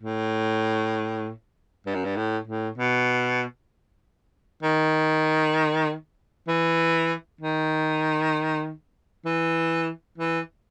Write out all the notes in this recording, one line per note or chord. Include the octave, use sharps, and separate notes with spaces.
A2
G2
F#2
G2
A2
A2
B2
D#3
E3
D#3
E3
E3